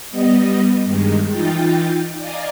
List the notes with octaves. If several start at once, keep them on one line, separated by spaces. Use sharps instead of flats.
G3 B3 D#5
G2 D#3 G#3
E3 D#4 F4 G5 A6
D5 D#5 F5 G#5 A#5